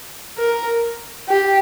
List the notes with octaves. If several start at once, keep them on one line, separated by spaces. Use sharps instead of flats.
A#4
G4